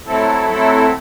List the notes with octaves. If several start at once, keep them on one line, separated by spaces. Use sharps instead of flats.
F#3 A3 C4 E4 A4
F#3 A3 C4 E4 A4